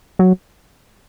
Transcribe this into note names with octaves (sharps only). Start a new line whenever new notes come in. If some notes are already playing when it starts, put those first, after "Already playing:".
F#3